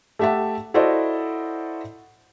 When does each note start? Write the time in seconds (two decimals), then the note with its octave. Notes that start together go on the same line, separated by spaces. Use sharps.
0.19 A3 G4 E5 F#5 A5
0.74 E4 F#4 A4 C5 D5 D#5